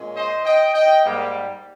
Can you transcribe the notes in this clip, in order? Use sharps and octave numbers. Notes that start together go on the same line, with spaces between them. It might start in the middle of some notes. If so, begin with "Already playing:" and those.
Already playing: A#2 G#3 C#4
C5 D#5
D#5 G5
D#5 G5
G#2 G3 A#3